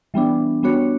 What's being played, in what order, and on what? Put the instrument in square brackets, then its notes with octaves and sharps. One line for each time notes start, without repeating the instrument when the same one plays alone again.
[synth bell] E3 G3 B3 D4
G3 B3 D4 F#4 C#5